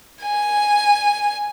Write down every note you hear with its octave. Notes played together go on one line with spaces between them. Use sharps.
G#5